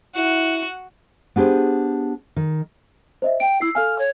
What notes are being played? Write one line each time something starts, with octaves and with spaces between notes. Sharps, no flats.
E4 F#4 F#5
B3 D4 G4 G#4 C5
D#3
C5 D#5 E5
G5 D7
E4 E6 C7
A4 F5 G#5 F6
C#5